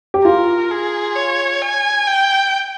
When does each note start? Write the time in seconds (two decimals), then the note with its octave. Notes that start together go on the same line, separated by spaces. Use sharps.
0.14 G4
0.24 F4 A#4
0.71 G#4
1.16 C#5
1.62 G#5
2.07 G5